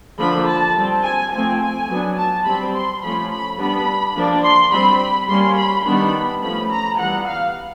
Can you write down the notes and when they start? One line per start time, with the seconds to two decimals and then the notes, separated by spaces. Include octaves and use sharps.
0.19 D3 F3 A#3 D4 B5
0.48 A5
0.76 G3 C4
1.04 G#5
1.32 F3 A3 C4 G#5
1.60 G#5
1.89 F#3 B3 D4
2.17 A5
2.45 G3 C4 B5
2.74 C6
3.02 F3 A3 C#4 B5
3.31 B5
3.59 G3 B3 D4 B5
4.15 F3 A#3 D4
4.43 C6
4.72 G3 C4 B5
5.29 G3 A#3 C#4 C6
5.57 B5
5.85 D#3 G3 B3 D4 B5
6.42 F3 A3 C#4 B5
6.70 A#5
6.98 E3 G3 B3 F#5
7.27 F5